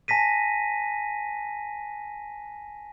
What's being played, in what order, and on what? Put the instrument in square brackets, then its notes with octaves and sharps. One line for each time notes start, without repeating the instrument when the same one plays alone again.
[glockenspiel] G#5 A5 A#6 B6 D#7